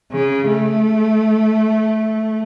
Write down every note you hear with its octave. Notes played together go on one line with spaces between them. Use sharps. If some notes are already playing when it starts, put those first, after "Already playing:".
C#3
A3